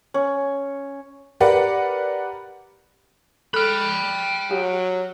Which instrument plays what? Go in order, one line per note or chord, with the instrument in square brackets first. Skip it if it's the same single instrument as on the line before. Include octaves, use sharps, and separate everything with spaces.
[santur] C#4
[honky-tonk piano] G4 A#4 B4 D5 F#5
[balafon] A4 [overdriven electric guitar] G5 B5 [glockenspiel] F6 F#6
[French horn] F#3 [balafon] G4